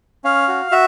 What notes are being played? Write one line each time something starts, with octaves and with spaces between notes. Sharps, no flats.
C#4 F5
F#4
F#4 E5